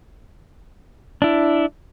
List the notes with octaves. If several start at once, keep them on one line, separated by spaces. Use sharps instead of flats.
D4 E4